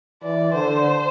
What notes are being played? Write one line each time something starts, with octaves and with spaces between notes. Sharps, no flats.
E3 D5
D3 C5